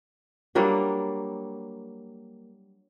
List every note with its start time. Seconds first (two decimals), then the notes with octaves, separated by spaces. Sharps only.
0.55 F#3 G3 A#3 D4